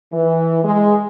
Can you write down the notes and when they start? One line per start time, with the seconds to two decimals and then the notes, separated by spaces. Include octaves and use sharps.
0.13 E3
0.64 G#3